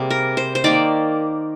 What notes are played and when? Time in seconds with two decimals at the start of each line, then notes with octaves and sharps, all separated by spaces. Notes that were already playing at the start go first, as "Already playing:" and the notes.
Already playing: C3 G3 A#3 G#4
0.10 A#4
0.37 C5
0.55 C5
0.64 D#3 A#3 D5